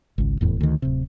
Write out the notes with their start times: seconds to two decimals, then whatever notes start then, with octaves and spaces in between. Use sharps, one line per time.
0.18 G#1 C#2
0.41 F1 E2 A2
0.61 D2 D#3
0.82 D1 C3